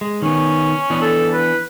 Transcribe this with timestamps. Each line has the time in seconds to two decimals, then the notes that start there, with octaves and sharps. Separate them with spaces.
0.01 G#3
0.22 D#3 B3 C#4
0.90 E3 B3 D4
1.02 A4
1.33 B4